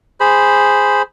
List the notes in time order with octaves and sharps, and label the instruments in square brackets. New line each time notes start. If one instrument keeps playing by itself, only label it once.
[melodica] G#4 C5 B5